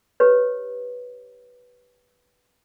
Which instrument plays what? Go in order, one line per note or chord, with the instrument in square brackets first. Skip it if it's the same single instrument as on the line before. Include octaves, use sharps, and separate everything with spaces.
[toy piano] G4 B4 C#5